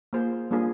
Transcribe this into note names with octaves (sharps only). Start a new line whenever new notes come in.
A#3 F4 G#4 C5
G3 A#3 D4 F4 G#4